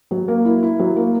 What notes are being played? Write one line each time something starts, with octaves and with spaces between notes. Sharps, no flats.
F#3
A#3
E4
E4
F#3
A#3